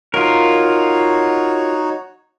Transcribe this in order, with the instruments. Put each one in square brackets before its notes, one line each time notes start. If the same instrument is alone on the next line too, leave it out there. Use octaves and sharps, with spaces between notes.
[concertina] D#4 F#4 C#5 [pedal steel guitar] F4 A#4